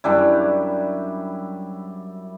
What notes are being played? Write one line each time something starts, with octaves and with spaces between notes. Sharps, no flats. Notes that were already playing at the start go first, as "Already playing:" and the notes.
F#2 G3 D4 E4